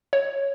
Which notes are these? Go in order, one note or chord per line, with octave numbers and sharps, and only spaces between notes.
C#5